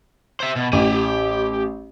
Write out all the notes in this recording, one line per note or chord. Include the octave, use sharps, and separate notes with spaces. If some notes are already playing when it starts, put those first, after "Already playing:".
C5 E5
B2
A1 G4 G#5